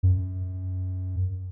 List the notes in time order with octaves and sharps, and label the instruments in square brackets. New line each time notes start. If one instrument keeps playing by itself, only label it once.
[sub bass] F#2